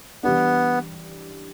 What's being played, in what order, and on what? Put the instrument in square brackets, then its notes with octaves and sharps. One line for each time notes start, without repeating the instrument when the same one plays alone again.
[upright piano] E3 G3 D4 [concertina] B3